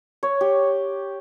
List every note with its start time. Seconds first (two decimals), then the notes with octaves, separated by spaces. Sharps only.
0.23 C#5
0.41 G4